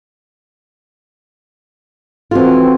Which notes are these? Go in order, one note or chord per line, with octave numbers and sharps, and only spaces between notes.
E3 C4 F4 F#4 A4